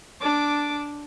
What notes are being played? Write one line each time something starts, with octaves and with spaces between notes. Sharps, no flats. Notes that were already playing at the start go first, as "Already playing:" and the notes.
D4 D6